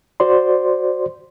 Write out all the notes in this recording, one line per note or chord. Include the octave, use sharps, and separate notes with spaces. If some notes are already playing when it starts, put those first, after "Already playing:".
F#4 C5 D5 C6